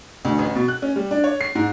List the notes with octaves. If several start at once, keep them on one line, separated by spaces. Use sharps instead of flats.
D2
A1
B2
F#6
C#4
G3
D4
C#5
C7
G#2